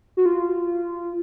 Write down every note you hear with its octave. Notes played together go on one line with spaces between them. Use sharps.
F#4
F4